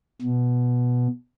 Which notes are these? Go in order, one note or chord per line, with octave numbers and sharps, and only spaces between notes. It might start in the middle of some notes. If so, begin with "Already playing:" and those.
B2